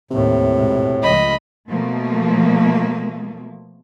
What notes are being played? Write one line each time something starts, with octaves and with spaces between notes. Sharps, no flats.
A1 D#2 A2 C3
G#2 B2 G#3
C#2 F3 A3 D#5 B5
B2 F3 A3 A#3